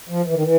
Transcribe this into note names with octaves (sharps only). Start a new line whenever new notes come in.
F3
E3
D#3
E3